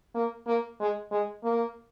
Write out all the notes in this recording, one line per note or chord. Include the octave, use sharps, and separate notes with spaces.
A#3
A#3
G#3
G#3
A#3